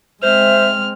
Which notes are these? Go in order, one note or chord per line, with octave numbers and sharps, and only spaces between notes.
G#3 C4 C5 E5 F6